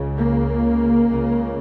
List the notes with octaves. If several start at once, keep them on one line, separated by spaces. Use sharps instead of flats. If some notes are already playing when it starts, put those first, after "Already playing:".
Already playing: C#2 C#3
A#3
C#2 C#3